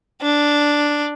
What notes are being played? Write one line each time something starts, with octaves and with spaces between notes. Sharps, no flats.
D4